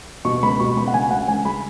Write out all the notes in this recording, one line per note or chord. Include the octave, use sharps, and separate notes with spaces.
B2 C#6
C#2 B5
B2 C#6
C#2 B5
F#5
C#2 G#5
C#2 F#5
C#2 G#5
G#3 B5